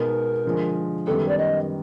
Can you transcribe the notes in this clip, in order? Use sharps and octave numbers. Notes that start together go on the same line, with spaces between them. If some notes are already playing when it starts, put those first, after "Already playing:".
Already playing: B2 G#3 B3 D#4 A#4
D3 F3 G#3
F#2 D#3 G3 B3 A4
D5
D#5